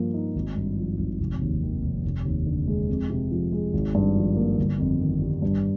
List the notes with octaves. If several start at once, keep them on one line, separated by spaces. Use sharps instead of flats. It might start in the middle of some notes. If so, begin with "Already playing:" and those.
Already playing: G2 F3 A#3
D#4
G#1
G2
F3
G#1
F1
D#2
D#3
F1
F1
D#2
D3
G#3
F2
C3
F3
G#3
G#1
G2
F3
A#3
G1
F2
D#3
G3
G2